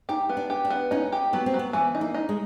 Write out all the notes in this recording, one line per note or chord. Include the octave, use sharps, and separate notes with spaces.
D#4 G4
B3
D4
G4
D4
B3
C#4 D#4
G4
F#3 B3
C4
F#3
B3
E3 B3
D#4
A#3
D#4
G#3